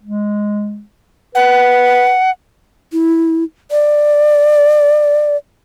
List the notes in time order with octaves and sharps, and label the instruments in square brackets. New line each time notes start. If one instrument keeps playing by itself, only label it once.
[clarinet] G#3
[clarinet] B4 [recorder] F#5
[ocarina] E4
D5